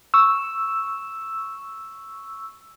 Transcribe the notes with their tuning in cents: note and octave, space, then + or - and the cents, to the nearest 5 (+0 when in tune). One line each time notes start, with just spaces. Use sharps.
C#6 +0 E6 +0